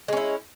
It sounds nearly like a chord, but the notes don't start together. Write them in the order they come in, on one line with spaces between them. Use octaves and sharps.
G#3 C#4 E4